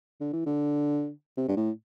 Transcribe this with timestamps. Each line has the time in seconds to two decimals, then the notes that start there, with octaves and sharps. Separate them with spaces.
0.20 D3
0.33 E3
0.46 D3
1.37 C3
1.48 G2
1.57 A2